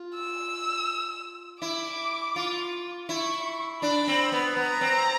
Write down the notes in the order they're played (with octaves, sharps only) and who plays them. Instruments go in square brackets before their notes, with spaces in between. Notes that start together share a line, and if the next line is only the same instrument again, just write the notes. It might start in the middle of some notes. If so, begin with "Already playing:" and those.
Already playing: [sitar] F4
[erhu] E6
[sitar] E4 [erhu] D6
[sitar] F4
[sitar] E4 [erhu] C#6
[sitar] D4 [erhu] B5
[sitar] C4
B3
[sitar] B3 [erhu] A#5
[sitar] C4